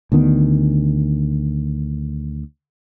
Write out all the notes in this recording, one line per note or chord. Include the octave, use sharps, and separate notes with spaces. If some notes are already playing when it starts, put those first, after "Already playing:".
D2 D3 D#3 B3